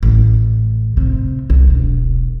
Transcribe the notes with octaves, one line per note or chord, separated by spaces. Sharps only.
A1
C3
C2
E1